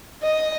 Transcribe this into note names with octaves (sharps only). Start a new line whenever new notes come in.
D#5